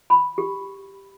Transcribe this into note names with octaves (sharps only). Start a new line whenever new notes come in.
B5
G4